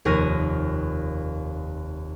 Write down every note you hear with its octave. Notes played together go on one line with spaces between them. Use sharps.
F1 D#2 A#4 C#6 A#6 D#7